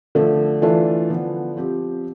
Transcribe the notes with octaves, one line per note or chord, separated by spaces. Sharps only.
D3 F3 A3
E3 A3 D4 F4 A4
D3 F3 B3
F3 C4 G4